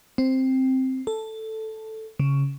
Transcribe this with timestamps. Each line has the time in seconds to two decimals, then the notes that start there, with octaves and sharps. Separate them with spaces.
0.18 C4
1.07 A4
2.20 C#3